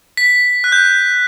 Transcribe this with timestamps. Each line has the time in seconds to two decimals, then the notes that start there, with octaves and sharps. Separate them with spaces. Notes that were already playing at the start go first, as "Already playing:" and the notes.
0.17 B6
0.64 F#6
0.72 G6